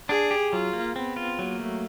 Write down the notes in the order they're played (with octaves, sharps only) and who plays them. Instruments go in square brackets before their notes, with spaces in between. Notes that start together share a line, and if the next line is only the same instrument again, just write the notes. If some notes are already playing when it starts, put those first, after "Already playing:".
[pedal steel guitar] D4 [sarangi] G#4
[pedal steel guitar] G4
[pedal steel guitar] F#3 [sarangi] F4
[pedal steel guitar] A#3
[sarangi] B3 [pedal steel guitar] C4
[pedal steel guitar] F4
[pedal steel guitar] F#3 [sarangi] A#3
[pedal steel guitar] A3